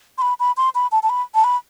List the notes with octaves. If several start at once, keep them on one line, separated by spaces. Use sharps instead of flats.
C6
B5
B5
C6
B5
A5
A5
B5
A5
B5